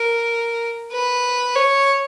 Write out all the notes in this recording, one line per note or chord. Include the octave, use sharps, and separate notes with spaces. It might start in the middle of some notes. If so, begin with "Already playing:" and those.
Already playing: A#4
B4
C#5